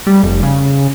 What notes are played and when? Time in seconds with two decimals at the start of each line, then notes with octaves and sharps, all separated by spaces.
0.07 G3
0.23 F1
0.43 C#3